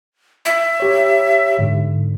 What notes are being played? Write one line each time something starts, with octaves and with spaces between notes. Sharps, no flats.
E5
G4 C#5
G#2 D3